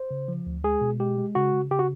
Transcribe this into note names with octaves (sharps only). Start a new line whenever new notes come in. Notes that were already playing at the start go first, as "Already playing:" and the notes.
Already playing: C5
C#3
F3
D2
G#3 G#4
B2
G#3 G4
G#3
C#3 F#4
C#3
C#3 G4
F#4